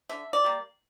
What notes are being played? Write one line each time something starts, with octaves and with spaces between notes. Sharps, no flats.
D3 E5
D5
G3 A#3